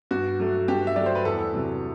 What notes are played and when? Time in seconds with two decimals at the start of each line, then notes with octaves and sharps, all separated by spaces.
0.11 G2 F#4
0.40 F#3 A3
0.68 G2 G4
0.87 E5
0.96 F#3 A3 D5
1.06 C5
1.15 B4
1.25 E2 A4
1.53 C3 F#3